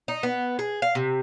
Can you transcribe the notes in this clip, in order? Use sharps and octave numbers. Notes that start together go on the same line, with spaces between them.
D#4
B3
G#4
F5
C3